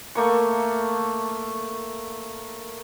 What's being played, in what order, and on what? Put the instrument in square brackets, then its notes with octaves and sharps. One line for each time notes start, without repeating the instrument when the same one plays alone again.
[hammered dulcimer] A3 A#3 C#6